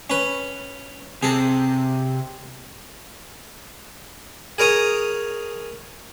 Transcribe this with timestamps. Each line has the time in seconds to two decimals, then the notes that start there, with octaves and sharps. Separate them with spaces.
0.10 C#4 B4
1.23 C3 G#4 A4
4.58 G#4 A#4 C#5 D#6